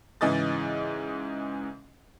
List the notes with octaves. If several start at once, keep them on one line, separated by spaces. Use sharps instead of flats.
G#2 C#3 E3 D#5 D#6 A6